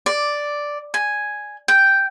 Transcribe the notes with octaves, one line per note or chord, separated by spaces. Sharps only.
D5
G#5
G5